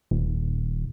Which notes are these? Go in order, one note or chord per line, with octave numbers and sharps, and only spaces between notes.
D#1